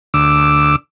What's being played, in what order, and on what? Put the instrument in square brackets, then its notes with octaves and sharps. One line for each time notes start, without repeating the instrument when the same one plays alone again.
[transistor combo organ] D2 D6 E6